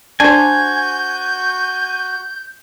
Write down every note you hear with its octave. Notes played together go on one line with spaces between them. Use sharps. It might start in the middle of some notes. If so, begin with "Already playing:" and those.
D4 F#4 C5 G#5 G6